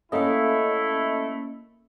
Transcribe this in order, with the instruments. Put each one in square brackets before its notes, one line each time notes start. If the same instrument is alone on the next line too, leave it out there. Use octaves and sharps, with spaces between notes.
[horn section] A3 E4 [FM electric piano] A#3 C#4 D#5 [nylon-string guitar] A4 F5